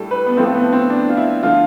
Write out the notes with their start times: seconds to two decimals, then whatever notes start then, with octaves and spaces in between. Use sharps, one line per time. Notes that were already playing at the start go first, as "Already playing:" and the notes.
Already playing: A2 G3 A4
0.11 B4
0.26 B3
0.37 A2 F3 A3 C4
0.54 B3
0.73 C4
0.90 D4
1.09 F4
1.17 E4
1.43 D3 F3 A3 F4